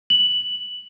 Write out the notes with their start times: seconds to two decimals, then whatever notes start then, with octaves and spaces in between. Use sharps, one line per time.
0.10 F#7